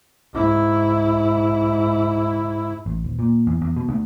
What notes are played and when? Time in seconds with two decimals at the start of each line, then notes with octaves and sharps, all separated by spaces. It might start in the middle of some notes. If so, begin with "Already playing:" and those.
0.33 G#2 E4
2.86 A1
3.04 D#1
3.19 A#2
3.47 E2
3.62 E2
3.76 B2
3.89 D2